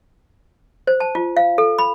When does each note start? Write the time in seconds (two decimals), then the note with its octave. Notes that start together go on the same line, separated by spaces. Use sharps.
0.87 C5
1.00 A5
1.15 F4
1.37 F5
1.58 A4
1.79 B5